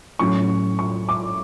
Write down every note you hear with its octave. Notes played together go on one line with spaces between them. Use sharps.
A2 F#3 C#4 C#6
C#6
D6